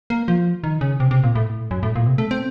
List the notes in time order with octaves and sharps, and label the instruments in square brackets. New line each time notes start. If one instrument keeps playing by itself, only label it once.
[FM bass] A#3
F3
D#3
C#3
C3
C3
A#2
A2
F#2
A2
A#2
C3
A3
C4